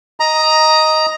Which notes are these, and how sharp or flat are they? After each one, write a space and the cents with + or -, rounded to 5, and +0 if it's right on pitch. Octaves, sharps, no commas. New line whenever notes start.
D#5 +5 A#5 +5